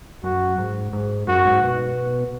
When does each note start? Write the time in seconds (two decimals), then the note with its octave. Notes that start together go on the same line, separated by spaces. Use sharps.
0.24 F#2 F#4
0.58 G#2
0.93 G#2
1.28 F#2 F#4
1.45 G#2
1.62 B2